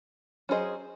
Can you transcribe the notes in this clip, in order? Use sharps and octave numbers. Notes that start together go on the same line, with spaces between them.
F#3 C#4 G#4 C5 D#5